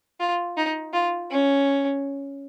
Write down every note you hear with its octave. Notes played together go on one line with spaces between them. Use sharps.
F4
D#4
F4
C#4